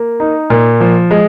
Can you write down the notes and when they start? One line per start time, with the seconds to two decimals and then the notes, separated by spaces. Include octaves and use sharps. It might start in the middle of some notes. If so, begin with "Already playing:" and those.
Already playing: A#3
0.20 D#4
0.50 A#2
0.80 F3
1.11 G#3